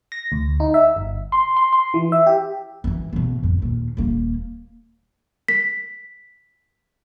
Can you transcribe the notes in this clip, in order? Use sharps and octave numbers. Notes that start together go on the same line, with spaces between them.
A#6
D2
D#4
E5
G1
C6
C6
C6
E3
E5
G4
F#2 E3
A1 B2
F2 D#3
D#2 A#2
D#1 A#3
B6